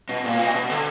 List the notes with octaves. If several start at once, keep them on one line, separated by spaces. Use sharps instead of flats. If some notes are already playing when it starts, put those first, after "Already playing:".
B2
A#2
B2
B2
D3